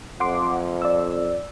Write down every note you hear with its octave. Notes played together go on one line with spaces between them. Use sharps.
F2 F#5 C6 D6
D5 E6